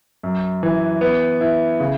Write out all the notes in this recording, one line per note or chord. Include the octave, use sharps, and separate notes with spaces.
F#2
E3
B3
E4
C#3